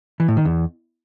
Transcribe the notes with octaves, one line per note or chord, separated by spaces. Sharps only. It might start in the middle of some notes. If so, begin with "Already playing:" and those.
E3
A2
D#3
E2